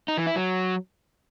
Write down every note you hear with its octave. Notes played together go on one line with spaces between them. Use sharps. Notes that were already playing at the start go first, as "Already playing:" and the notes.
D#4
E3
E4
F#3